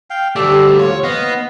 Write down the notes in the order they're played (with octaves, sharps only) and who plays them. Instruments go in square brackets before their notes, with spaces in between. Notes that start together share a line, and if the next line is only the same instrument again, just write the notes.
[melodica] F5 G5
[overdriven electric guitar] D2 A3 [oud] G3 F#4 G4 [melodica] A4 D5
[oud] D#2 F3 [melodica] F4 [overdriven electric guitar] C#5
[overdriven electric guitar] B3 [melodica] D#5 F5 F#5